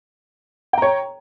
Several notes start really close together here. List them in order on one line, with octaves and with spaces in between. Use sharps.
G5 A#5 C#5